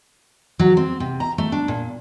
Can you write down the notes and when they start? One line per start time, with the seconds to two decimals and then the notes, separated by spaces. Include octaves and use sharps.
0.59 F#3
0.77 C4
1.00 C3
1.20 A#5
1.38 A3
1.52 D4
1.68 A#2